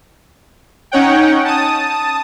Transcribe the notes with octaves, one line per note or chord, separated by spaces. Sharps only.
C#4 D#4 C#5 F#5 G5
A5 D#6